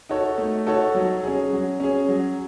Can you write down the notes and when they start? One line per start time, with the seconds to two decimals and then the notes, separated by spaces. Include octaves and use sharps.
0.09 D#4 F#4 A4 C#5
0.38 A3
0.67 D#4 F#4 A4 C#5
0.95 F#3
1.24 C#4 G#4
1.53 F#3
1.80 C#4 G#4
2.08 F#3